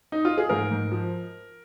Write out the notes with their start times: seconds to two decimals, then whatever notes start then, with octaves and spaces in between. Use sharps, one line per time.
0.12 D#4
0.25 F4
0.38 G#4
0.49 G#2 A#4
0.71 G#2
0.92 F3